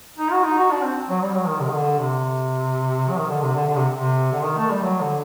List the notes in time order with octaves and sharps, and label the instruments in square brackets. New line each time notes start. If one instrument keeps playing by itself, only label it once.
[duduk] D#4
F#4
D#4
F#4
D4
C4
F#3
G3
F#3
D#3
C3
D#3
D3
C3
F#3
D#3
D3
C3
D3
D3
C3
C3
D3
D#3
A3
G3
F#3
D3